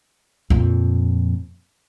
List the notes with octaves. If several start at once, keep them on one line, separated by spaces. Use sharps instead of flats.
F2 A#2